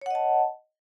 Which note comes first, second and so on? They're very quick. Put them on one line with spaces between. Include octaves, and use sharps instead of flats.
C#5 F#5 D#5 A5